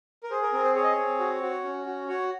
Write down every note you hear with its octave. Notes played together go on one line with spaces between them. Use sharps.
A#4
G#4 C5
A#4
C4 A#4
C5
G#4 C#5
D#5
C#5
C4
F#4
F#4
C#4
F#4
F#4 C#5